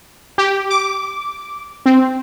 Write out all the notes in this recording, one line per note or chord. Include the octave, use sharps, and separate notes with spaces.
G4
D6
C4